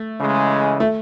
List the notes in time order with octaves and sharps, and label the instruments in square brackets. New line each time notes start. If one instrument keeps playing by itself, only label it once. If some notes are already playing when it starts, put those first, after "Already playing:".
Already playing: [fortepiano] A3
[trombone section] C#3 E3 G#3
[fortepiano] A3